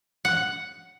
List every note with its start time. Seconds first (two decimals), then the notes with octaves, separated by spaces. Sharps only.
0.25 F#5